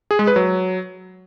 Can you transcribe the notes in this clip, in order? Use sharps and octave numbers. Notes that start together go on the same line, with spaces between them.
G#4
G#3
B4
F#3